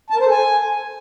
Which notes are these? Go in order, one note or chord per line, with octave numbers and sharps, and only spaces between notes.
A5
A#4
C5
A4
G#5